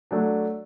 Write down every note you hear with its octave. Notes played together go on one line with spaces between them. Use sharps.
F#3 A3 D4